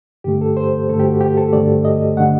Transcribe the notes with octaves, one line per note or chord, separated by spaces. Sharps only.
G2 D3 A3 G4
A4
C5
G2 D3 A3 A4
G4
F#4
G4
A4
G2 D3 A3 D5
D#5
D3 A3 F#5